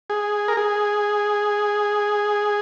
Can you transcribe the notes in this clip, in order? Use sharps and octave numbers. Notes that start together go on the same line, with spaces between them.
G#4
A#4
G#4